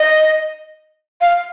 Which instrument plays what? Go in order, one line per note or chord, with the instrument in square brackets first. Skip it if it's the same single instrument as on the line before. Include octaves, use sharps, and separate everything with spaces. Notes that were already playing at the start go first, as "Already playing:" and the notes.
Already playing: [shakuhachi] D#5
F5